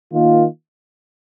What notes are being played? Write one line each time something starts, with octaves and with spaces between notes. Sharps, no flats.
D#3 A#3 F4